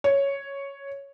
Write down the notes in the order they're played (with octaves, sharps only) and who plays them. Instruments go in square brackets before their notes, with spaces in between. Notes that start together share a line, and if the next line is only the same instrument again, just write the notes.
[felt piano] C#5